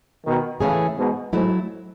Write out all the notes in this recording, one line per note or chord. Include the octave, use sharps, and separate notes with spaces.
B2 D#3
A2 C#3 E3 A3 C#4 E4 G#4
G#2 B2
G#2 F#3 A3 E4